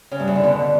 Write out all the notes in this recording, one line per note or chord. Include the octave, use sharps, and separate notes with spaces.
C#3
G2
E2
D3
B2